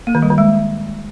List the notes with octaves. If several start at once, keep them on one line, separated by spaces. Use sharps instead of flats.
A#3
D#3
G3
D#3
G#3